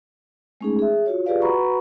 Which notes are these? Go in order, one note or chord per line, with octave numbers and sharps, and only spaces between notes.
G#3 A3 C#4 D#4 G#4
G#4 E5
F4 F#4 C#5
F4 G4 G#4 B4 D5 F5
F#4 B4 F#5 A#5 B5 C#6